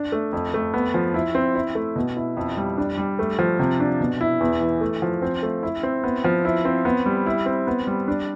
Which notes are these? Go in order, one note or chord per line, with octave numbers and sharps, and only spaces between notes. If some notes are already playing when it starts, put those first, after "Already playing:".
Already playing: D4
A3
F2
A3
B3
F3
E4
C4
E4
A3
B2
E4
F2
G3
D4
G3
A3
F3
C3
D4
B2
E4
E2
E3
A3
F3
C4
A3
E4
C4
B3
F3
E4
C4
B3
G3
E4
C4
B3
G3
D4